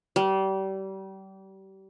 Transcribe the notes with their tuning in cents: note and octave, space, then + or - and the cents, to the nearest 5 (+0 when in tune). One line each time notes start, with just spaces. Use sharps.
G3 -30